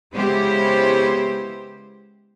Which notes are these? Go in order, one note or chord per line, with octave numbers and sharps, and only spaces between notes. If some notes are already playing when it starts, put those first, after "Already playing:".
C#3 G#3 B3 E4 G4 C5